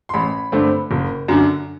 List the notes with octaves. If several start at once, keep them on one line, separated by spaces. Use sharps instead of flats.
C6
A1 B5
G2 D3 A3 C4
F#1
F#2 D3